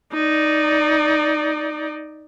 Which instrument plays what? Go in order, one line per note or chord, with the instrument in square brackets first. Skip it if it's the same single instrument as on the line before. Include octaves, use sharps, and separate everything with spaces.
[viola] D#4 D5